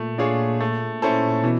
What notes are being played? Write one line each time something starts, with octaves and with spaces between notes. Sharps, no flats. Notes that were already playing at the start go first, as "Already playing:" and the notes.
Already playing: A#2 A3
D4 F4 G#4 C#5
A3
C#4 E4 A4 C5
B2 E3